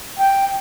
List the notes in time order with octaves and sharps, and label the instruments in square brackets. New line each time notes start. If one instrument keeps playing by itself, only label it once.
[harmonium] G5